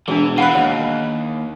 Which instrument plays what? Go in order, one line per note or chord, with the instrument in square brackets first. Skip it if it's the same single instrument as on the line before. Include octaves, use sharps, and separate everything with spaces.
[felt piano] E1 [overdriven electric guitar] E3 [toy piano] D4 G#4
[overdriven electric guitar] E3 [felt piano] F5 B5 F#6 [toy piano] F#5
[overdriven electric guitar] D#2 [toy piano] C#5